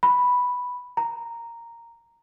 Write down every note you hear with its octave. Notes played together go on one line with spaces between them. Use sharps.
B5
A#5